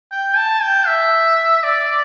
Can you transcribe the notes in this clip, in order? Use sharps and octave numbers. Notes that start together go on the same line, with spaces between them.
G5
A5
G5
E5
D5